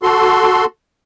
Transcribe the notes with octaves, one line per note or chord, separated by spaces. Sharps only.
F#4 A4 C6